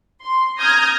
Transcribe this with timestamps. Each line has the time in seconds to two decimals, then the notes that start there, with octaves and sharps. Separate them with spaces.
0.23 C6
0.58 A#5 D#6 F6 G6 G#6 A#6